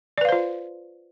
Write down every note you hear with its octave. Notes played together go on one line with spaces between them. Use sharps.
F4 B4 C5 D5 F5